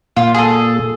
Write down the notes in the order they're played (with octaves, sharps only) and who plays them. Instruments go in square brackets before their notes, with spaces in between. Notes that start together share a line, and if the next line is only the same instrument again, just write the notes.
[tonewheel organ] A#2 [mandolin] F4
[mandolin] G#4 A4